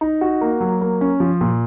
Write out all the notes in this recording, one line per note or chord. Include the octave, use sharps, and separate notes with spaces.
D#4
F#4
A#3
F#3
A#3
C#4
F3
A#2